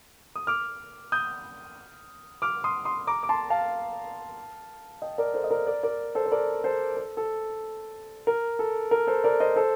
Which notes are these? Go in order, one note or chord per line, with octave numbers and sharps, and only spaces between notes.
D#6
D6 F6
D#6 G6
D6 F6
C6 D#6
C6 D#6
A#5 D6
D6
A5 C6
F5 A5
D#5 G5
A#4 D5
A4 C5
D#5
A#4 D5
A#4 D5
A#4 D5
A4 C5
C5
A#4 D5
A4 C5
A4
A4
A#4
A4
A#4
A4 C5
A#4 D5
C5 D#5
A4 C5